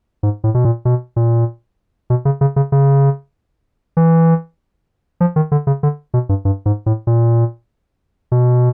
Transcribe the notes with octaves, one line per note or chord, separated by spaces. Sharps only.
G#2
A2
B2
A#2
B2
A#2
B2
C#3
C#3
C#3
C#3
E3
F3
D#3
D3
C#3
D3
B2
G2
G2
G#2
A2
A#2
B2